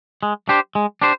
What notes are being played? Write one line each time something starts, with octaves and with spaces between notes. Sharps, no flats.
G#3
D4 G4 C5
G#3
D4 G4 C5